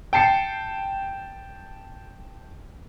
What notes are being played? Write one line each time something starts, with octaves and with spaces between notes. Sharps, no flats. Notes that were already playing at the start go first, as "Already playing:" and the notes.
G5 A5 C7 C#7